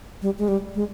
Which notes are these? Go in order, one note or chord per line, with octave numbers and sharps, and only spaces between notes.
G3
G#3
G3
G#3